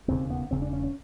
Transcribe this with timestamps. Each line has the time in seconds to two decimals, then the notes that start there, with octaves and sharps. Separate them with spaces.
0.08 E1 D#2 C#3 C4
0.30 B3
0.51 E1 D#2 C#3 C4
0.62 D4
0.73 C#4
0.84 C#4